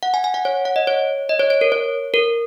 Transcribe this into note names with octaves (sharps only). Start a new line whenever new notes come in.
F#5
G#5
G#5
F#5
C#5
F#5
D#5
C#5
D#5
C#5
C#5
A#4
C#5
A#4